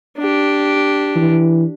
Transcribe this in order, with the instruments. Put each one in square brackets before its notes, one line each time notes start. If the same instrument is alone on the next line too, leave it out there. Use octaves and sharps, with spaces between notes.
[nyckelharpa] D4 G4
[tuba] E3